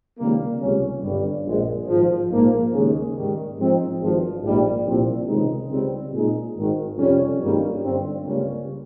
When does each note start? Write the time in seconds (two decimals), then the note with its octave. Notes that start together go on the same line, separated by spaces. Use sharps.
0.18 C#2 C3 D#3 G3 A#3
0.61 C#2 C3 G3 C#4
1.02 G1 G2 G3
1.44 A#1 A#2 G#3
1.87 G#1 G#2 F3
2.29 A#1 G#2 F3 A#3
2.73 D#2 C#3 G#3 C#4
3.15 G#2 D#3 G3
3.58 G#2 F3 C4 D#4
3.99 G#1 G2 F3
4.42 A#1 G#2 G3 A#3
4.84 C2 A#2 F3 C4
5.27 C#2 C3 D#3 G#3 D#4
5.69 C#2 C#3 G3 C4
6.13 A#2 G#3 D#4
6.55 G#1 G#2 D#3
6.97 F2 C3 G3 C#4
7.40 G#1 G2 G3 A#3 D#4
7.82 G1 G2 G3 C4
8.24 C#2 C#3 G3 A#3 C#4